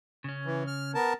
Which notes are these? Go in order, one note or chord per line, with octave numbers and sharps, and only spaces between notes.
C#3 C#4
E3
F6
B3 A#4 A5